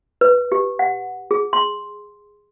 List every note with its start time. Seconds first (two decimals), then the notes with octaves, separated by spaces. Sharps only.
0.21 B4
0.52 G4
0.79 F#5
1.31 G#4
1.53 C6